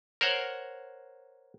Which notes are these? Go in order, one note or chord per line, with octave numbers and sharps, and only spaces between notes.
A#4 C5 C#5 F#5